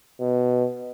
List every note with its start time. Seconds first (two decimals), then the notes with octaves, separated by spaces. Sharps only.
0.20 B2